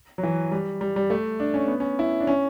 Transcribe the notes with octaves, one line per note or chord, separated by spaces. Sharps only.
F#3
E3
G3
G3
G3
A3
D4
C#4
B3
C#4
E4
D4
C#4